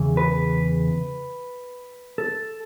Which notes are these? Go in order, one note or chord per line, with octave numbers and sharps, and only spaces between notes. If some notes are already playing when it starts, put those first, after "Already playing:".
Already playing: E2 C#3 E3
B4
A4